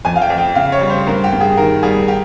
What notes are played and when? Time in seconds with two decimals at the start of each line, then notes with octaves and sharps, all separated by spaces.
0.05 F2 G#5
0.16 F5
0.22 G5
0.30 F2
0.38 G5
0.55 C#3 F5
0.72 C#5
0.81 G3
0.89 C5
1.06 G2 A#4
1.24 G4
1.32 G2
1.40 G#4
1.57 D#3 A#4
1.83 G3 G#4
2.08 G4